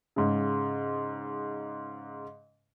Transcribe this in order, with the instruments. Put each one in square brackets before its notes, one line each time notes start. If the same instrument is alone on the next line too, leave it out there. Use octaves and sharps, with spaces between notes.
[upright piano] G#2 C#3